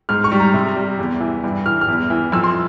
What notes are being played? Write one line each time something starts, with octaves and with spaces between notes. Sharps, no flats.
G#2 F6
C#6
G3
A#5
C3
G3
E2
E3
G2
E3 F6
F6
E2
E3
F2 E6
C6